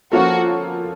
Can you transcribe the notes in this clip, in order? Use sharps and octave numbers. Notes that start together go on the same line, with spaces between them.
F3 A#3 C#4 F4 F#4 A4